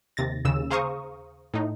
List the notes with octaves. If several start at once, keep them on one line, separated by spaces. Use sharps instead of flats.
D#2 C3 A6 A#6
D#2 C#3 E6 E7
G#4 C5 F5 A#5 C#6 D#6
A2 D#4